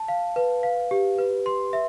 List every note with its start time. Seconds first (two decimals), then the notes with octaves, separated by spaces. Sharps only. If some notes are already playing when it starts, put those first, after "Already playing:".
Already playing: A5
0.08 F5
0.36 B4
0.63 F5
0.91 G4
1.19 B4
1.46 C6
1.73 E5